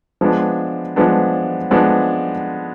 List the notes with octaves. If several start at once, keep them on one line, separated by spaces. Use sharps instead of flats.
F3 G#3 B3 D4
F3 G#3 B3 D4
F3 G#3 B3 D4